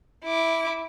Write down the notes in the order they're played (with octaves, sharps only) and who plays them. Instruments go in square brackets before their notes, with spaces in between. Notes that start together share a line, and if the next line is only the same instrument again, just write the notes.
[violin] E4 D6